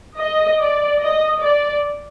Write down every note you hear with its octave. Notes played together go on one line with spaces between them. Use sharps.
D#5
D5
D#5
D5